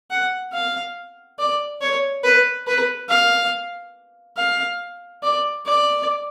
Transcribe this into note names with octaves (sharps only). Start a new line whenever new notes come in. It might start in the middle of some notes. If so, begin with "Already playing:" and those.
F#5
F5
D5
C#5
B4
B4
F5
F5
D5
D5